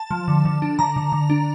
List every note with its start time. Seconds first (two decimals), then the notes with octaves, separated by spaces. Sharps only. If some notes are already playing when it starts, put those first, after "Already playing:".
Already playing: A5
0.11 F3
0.28 D3
0.45 D3
0.62 D4
0.79 D3 A#5
0.96 D3
1.12 D3
1.30 D4